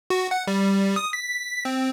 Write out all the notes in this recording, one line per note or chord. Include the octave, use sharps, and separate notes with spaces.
F#4
F#5
G3
D#6
B6
C4